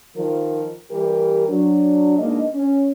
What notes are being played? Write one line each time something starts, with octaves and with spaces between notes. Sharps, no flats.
D#3 F3 A#4
E3 G3 G4 A#4
F#3 D4
B2 G#3 A#3 D4 D#4 D#5
C#4